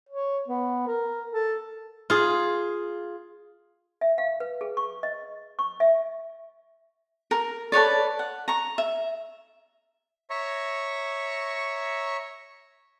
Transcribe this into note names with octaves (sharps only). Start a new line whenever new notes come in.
C#5
B3
A#4
A4
F4 G#4
E5
F5
B4
G#4
C#6
D#5
C#6
E5
A#4
A4 B4 C#5 D5
F#5
A#5 C#6
E5
C#5 E5 A#5 C#6